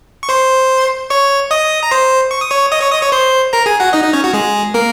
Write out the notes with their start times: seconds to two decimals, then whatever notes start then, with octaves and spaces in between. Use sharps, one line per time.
0.23 C#6
0.29 C5 C6
1.10 C#5 C#6
1.51 D#5 D#6
1.83 A#5
1.91 C5 C6
2.31 C#6
2.41 D#6
2.50 C#5 C#6
2.72 D#5 D#6
2.81 C#5 C#6
2.92 D#5 D#6
3.02 C#5 C#6
3.12 C5 C6
3.53 A#4 A#5
3.66 G#4 G#5
3.80 F#4 F#5
3.93 D#4 D#5
4.04 D#4 D#5
4.13 C#4 C#5
4.24 F#4
4.33 G#3 G#4
4.74 A#3 A#4